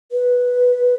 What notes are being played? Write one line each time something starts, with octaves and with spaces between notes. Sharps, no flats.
B4